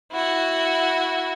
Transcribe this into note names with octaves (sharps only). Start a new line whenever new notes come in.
E4 F#4